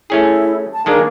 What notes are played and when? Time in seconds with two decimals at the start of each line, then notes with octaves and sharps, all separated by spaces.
0.10 A3 C#4 E4 G#4
0.73 A5
0.86 D#3 G#3 A#3 D4